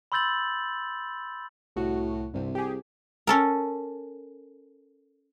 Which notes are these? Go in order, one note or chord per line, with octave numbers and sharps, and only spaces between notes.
B5 C6 E6 G6 A6 F#7
C2 A2 F#4
C2 G2 C3
G4 G#4
C#4 A4 A#4